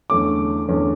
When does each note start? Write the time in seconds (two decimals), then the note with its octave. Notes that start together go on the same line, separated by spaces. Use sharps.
0.10 E2 D3 A3 C#4 D6
0.69 E2 D3 A3 C#4